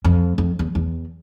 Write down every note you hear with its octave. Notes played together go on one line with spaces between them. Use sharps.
F2
F2
E2
E2